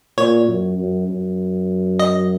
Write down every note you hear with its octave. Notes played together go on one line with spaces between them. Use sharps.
A#2 C#5
F#2
F#2
F#2
D#5